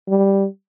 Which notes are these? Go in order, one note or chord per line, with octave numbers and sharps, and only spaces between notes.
G3